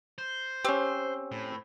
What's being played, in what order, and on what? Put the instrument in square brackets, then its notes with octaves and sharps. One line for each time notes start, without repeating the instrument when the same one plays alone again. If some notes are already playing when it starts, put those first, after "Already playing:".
[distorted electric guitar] C5
[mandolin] C4 [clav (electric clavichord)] C#4 G4
[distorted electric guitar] A2